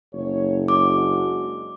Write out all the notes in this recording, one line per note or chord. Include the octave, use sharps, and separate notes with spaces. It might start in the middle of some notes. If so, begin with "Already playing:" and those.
F#1 C#5
G#3 D4 F#4 D6